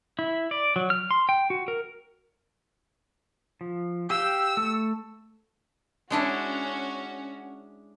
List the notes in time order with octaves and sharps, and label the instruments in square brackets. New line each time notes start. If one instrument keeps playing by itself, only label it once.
[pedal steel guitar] E4
D5
F#3
F6
C6
G5
F#4
A#4
F3
[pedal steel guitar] G4 F5 G5 [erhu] E6
[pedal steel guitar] A3 A4
[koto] G#3 D4 E4 [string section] C#4 F#4